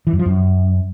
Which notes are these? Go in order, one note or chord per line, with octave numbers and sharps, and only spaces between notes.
E3
F#2
F3
F#2